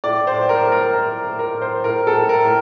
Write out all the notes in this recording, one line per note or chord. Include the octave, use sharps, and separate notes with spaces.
A2 D5
C5
A2
A#4
A2
A#4
A2 A#4
A2
A#4
A2
C5
A2 A#4
A4
A2
A#4
A2